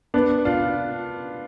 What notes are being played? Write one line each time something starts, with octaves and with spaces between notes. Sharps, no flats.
B3 D4
D4 F4